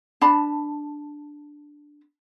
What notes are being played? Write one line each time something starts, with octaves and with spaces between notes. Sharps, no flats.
D4 A5 B5